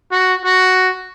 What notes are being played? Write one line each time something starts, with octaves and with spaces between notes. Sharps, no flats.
F#4
F#4